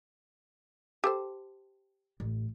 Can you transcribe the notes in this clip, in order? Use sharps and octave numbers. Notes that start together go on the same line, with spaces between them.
G4 A4 C5
A1